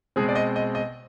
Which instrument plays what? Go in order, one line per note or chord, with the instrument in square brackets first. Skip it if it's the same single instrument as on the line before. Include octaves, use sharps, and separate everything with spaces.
[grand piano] B2 G#3 C4 G#4
D5
D#5
D#5
D#5